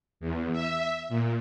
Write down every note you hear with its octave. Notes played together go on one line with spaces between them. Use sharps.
E2
E5
A#2